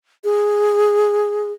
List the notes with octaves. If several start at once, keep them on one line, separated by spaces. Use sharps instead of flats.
G#4